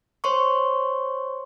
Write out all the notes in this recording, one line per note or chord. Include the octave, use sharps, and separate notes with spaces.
C5 C#5 C6 C#6